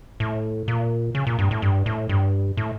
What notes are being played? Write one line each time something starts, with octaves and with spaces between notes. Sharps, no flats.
A2
A#2
C#3
A#2
G2
A2
G2
A2
G2
A2